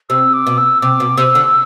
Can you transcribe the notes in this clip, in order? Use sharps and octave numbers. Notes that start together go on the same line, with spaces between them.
C3 E6
D6
B2
E6
C3 D6
B2
C3 E6
D3